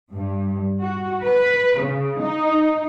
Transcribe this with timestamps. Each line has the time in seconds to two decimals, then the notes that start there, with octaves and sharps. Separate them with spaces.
0.12 G2
0.80 F#4
1.23 B4
1.81 C#3
2.22 D#4